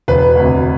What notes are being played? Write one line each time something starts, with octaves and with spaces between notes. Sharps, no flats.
E1 B4
D2 C3